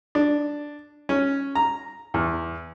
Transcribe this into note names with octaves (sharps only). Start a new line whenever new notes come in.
D4
C#4
A#5
E2